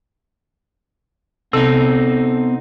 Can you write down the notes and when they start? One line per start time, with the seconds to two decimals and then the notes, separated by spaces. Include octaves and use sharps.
1.53 C3 B3 C4 D#4 A4